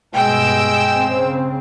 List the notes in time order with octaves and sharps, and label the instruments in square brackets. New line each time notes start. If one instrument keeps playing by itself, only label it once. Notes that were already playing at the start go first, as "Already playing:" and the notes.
[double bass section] G2 B2 [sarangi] G#3 [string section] G5 E6
[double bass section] C#3 C4